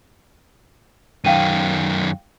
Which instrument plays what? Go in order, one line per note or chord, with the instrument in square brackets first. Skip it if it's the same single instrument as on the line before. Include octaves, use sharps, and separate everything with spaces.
[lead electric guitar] F#2 D#3 [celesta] F5 G5 D#7